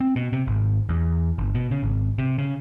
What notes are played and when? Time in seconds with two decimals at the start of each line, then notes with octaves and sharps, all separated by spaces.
0.01 C4
0.16 B2
0.33 C3
0.47 G#1
0.89 E2
1.38 G1
1.55 B2
1.71 C#3
1.83 G#1
2.18 C3
2.38 C#3